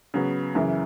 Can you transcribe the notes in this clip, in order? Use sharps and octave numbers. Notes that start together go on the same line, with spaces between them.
C#3 F#3 B3
F#2 C#3 E3